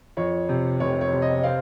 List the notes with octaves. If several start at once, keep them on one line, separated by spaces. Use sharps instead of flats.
F2 C#5
C3
F1 C#5
C#5
C3
D#5
C4 F5